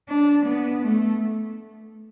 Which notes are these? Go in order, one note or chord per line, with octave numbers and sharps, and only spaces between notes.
D4
B3
A3